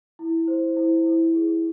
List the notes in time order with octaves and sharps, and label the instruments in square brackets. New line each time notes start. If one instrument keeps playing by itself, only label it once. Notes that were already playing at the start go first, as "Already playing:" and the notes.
[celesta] E4
C5
E4
E4
G#4